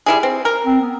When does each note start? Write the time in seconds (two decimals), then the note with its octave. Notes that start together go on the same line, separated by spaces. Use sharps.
0.06 G3 E4 G#4
0.23 C4
0.45 A#4
0.65 C4
0.82 B3